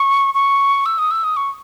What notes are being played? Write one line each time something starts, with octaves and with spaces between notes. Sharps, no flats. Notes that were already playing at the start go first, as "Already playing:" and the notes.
Already playing: C#6
C#6
E6
D#6
E6
D#6
C#6